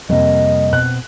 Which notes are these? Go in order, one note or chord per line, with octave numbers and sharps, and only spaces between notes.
F2 C3 G3 A#3 D#5
B2 C4 F#6